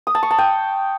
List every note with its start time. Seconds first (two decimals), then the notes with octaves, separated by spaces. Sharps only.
0.07 D#6
0.15 A5
0.23 C#6
0.31 A5
0.38 G5